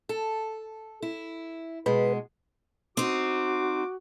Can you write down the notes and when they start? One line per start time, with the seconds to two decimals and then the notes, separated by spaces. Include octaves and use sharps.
0.09 A4
1.02 E4
1.86 B2 G#3 B4
2.97 C4 D#4 F#4 D6